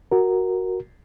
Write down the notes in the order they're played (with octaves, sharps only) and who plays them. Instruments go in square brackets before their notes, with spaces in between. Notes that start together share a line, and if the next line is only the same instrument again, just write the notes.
[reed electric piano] F#4 A#4